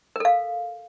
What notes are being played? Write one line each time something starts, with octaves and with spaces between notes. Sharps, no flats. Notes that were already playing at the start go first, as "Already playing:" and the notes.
A4 A#4 F5